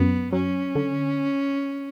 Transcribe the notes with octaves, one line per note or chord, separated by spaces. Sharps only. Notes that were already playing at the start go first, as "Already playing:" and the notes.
Already playing: F#2 B3
F#3 C#4
D3